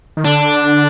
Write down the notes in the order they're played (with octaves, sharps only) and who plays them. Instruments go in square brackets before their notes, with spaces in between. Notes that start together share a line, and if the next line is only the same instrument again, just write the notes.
[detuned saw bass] D#3
[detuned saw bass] D3 [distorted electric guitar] D4